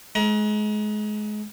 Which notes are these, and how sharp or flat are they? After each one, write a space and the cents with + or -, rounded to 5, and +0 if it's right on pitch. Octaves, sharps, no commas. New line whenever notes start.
G#3 +30 A#5 +35